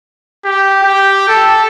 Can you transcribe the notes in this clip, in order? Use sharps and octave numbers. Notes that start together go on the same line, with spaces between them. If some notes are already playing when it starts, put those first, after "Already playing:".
G4
G4
A4